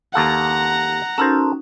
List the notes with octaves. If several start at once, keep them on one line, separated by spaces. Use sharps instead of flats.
D#2 A4 F5 F#5 A#5
C#4 D#4 F#4 A4 A#4 C5